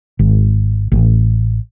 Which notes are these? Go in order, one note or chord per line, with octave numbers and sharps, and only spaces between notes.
G#1
A1